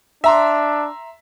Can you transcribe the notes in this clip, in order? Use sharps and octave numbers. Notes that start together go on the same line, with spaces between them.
D4 E5 A#5 C6